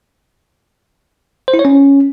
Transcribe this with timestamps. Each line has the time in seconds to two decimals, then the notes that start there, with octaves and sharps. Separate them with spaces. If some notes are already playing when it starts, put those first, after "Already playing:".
1.48 C5
1.54 E4
1.59 C#5
1.65 C#4